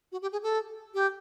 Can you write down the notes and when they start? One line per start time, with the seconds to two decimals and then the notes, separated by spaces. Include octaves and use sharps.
0.12 F#4
0.22 G4
0.32 G#4
0.43 A4
0.94 G4